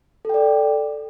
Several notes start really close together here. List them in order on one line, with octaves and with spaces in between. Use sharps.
A4 G5 D5